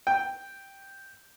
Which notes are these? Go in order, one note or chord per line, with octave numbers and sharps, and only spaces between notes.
G5